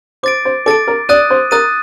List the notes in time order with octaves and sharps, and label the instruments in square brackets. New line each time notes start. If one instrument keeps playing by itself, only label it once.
[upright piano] C5 [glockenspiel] D6 A6 D7
[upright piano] C5
[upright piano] A4 [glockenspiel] D6 A6 D7
[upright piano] A#4
[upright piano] D5 [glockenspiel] D#6 F#6 A6 D#7
[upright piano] C5
[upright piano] A#4 [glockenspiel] D#6 F#6 A6 D#7